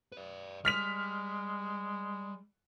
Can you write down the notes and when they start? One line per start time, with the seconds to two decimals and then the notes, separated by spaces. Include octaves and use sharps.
0.12 B4 D5
0.65 G3 G#3 F6 B6 F7